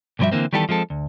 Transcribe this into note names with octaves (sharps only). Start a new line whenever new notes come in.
B1 G2 F3 G3 F#4 E5
D3 E3 A#3 C4
D#3 E3 G3 B3 G4 A4
F3 G#3 C4 A4
D2